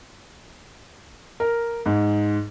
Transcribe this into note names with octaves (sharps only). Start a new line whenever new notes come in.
A#4
G#2